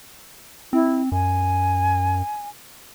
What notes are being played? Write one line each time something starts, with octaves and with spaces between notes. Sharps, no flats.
C4 E4
F#2 G#5